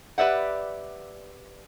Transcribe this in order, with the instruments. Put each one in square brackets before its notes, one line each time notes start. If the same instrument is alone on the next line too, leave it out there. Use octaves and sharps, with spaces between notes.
[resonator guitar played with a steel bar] G4 B4 D5 E5 F#5